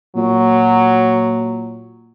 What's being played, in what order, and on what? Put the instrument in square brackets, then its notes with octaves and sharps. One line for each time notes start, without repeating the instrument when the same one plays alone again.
[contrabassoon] A#2 [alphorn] F#3